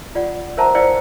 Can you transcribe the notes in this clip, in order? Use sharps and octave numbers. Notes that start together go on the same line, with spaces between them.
F4 D5 F#5
A#4 C5 E5 F#5 A5 A#5
E4 C5 D5 F5 G5 E6